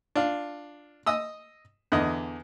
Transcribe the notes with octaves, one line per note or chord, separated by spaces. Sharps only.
D4 F4
D#5 D#6 E6
E2 D3 D#5